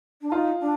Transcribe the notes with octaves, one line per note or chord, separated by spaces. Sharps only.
D4
D#4 F4
D4